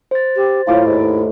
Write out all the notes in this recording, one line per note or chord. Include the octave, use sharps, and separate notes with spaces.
C5 A6
G4
A2 E4 F4 D6
D#2 G#2